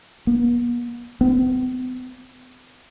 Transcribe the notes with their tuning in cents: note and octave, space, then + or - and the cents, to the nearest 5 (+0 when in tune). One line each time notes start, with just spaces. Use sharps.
B3 -45
B3 +45